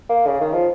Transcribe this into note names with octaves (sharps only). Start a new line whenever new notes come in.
A#3
C#3
D#3
F3